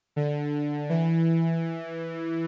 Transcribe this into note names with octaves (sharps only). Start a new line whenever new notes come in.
D3
E3